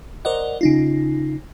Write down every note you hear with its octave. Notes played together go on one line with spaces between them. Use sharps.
A#4 C5 D5 D#5 F#5
C#3 D#4 F4